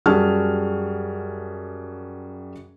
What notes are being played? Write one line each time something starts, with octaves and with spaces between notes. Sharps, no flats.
F#2 G3 F#4 G#4 A5 F6